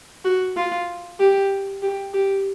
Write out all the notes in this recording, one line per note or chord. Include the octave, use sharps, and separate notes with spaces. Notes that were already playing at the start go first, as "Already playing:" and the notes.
F#4
F4
G4
G4
G4